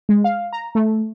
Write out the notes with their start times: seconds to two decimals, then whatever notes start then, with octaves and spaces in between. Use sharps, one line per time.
0.09 G#3
0.24 F5
0.53 A#5
0.75 A3